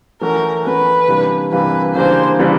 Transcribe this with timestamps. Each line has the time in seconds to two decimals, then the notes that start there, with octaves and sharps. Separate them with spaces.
0.21 E3 A3 C#4 F#4 A#4
0.65 E3 A3 C#4 F#4 B4
1.08 C3 E3 G3 A#3 D4
1.52 C3 E3 G3 A#3 D4 B4
1.95 C#3 E3 G3 A#3 D4 C5
2.39 C#3 E3 G3 A#3 D4